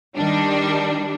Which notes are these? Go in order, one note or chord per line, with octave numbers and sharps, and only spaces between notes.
D#3 G3 D4